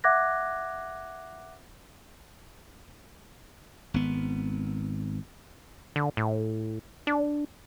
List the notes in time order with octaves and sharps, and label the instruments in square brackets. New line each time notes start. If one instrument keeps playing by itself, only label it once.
[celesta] E5 F#5 D6 F#6 G#6 A#6
[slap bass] G#1 B3
[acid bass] D3
A2
D4